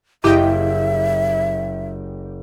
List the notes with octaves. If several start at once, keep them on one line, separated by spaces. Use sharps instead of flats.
F#1 E4 G4 D#5 E5 G5